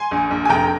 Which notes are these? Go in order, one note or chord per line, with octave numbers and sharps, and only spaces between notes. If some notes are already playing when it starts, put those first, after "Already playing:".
Already playing: G#5 C6
A#1
A#1
G#5
F1 G5 A#5